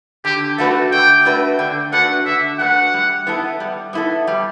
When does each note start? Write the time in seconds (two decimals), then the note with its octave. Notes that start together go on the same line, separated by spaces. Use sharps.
0.25 D3 G4
0.58 A3 D4 F#4 A4 B4
0.92 D3 G5
1.25 A3 D4 F#4 B4
1.58 D3 G5
1.92 A3 D4 F#4 B4 F#5
2.26 D3 E5
2.59 A3 D4 F#4 B4 F#5
2.94 G3
3.27 B3 E4 A4
3.60 G3
3.93 B3 E4 A4
4.27 G3